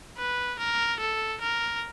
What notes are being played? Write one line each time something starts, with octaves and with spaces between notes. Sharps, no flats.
B4
A#4
A4
A#4